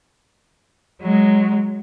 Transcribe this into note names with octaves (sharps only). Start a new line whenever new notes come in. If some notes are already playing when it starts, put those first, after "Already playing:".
F#3 G#3